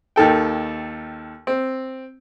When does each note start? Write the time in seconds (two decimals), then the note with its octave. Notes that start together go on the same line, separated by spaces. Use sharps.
0.16 D#2 D#3 A4 G5
1.47 C4